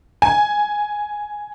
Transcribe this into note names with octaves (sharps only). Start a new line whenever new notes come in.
G#5